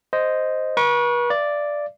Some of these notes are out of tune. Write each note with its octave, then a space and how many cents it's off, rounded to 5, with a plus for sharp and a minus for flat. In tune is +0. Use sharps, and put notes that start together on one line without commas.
C5 -5 D#5 +0
B4 -40 C#6 +0
D5 +0 F5 -45